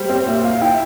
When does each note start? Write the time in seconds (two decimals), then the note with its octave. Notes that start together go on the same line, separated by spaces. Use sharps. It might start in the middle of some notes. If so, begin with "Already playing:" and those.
Already playing: G3 C5
0.09 C4 C#5
0.26 A#2 E5
0.44 A#2 F5
0.61 E4 G5